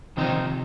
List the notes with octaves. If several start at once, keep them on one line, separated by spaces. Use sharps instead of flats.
C3 D#3 F3 C4 D#4